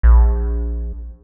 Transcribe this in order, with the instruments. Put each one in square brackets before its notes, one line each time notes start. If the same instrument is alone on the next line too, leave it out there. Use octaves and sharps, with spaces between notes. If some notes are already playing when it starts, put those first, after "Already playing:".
[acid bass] A#1